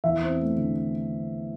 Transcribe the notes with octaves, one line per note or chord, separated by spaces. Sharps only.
E2 E5
C4
A3
D3